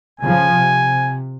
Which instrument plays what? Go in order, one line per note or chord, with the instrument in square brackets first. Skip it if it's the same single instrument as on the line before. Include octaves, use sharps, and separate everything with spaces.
[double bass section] C#3 F3 [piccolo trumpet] G#5
[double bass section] C3